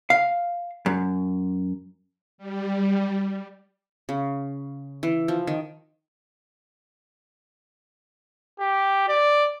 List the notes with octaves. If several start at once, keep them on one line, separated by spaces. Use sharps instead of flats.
F5
F#2
G3
C#3
E3
F3
D#3
G4
D5